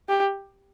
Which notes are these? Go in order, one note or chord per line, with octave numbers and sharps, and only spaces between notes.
G4